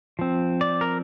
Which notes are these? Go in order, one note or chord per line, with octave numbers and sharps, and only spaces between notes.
F3 C4
D5
A#4